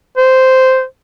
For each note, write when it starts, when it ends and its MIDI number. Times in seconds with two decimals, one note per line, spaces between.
0.17 0.84 72